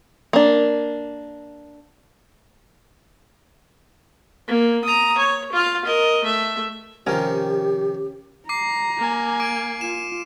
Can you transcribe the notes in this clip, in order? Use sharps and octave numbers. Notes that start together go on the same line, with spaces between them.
A#3 D4
A#3
A#5 D#6
C#5
F4 F5
A#4 D#5
A3 E5
C3 D#3 F3 C#4 G4 A#4 G5
A#5 D6 C7
A#3 G#5
D6 D7
F4 E7